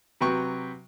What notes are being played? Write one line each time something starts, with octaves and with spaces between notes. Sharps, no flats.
C3 F#3 B4 G5 C#6